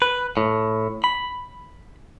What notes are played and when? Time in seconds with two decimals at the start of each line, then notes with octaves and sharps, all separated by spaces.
0.02 B4
0.37 A2
1.04 B5